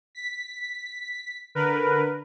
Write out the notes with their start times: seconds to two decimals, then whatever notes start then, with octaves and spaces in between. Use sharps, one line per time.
0.15 B6
1.55 D3 A#4 B4